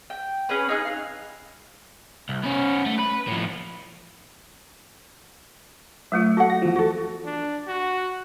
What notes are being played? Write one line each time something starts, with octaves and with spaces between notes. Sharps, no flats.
G5
C#4 G#4 B4
D#4 G#4 F6 F#6
F5
C2
B3 C#4
A3
B4
A2 F3
F#3 A3 F4 E5
F#4 A4 F#5
A#6
E2 F3
F#4 A4
D4
F#4